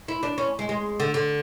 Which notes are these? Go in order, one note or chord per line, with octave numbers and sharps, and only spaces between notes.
E4
D4
C#4
G#3
G#3
D3
D3